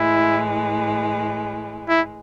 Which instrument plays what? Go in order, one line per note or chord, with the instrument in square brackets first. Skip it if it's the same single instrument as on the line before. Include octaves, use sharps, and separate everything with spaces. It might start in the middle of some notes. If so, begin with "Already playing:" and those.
Already playing: [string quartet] A2 E3 G#3 [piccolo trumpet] E4
[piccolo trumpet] E4